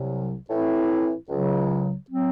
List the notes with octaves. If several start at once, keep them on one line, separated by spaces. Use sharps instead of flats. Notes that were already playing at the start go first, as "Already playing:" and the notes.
Already playing: C2 C3 F#3
A2 E3 C4 E4
C#2 C#3 F#3
F#3 C4